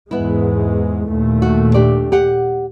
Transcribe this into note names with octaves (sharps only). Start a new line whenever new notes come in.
E2 G#2 G#3 B3 E4
D#2 A#2 A3
F#4
D4 G4 D5
G4 F#5